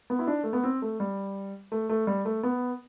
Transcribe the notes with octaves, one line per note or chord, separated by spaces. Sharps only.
B3
E4
D4
A3
B3
C4
A3
G3
A3
A3
G3
A3
B3